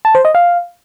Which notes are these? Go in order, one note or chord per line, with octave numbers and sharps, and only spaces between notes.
A5
C5
D#5
F5